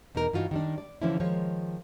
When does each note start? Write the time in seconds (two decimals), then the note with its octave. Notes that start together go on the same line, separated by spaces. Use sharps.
0.15 E2 B2 D#4 A#4
0.33 G2 E3 D#4 F4 F#4
0.51 D#3 G3 D4
0.78 D5
1.02 D3 E3 F3 C#4 D4 E4
1.20 D#3 F3 G#3 C#5